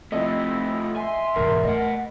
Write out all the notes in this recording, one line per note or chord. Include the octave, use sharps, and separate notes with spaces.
F3 A3 C4 E4 D#5
E5 G#5 C6
E2 G#2 B2 A#4
A3 D#5 F#5